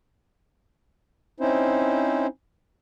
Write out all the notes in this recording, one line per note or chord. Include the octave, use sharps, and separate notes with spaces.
C4 C#4 D#4 E4 C5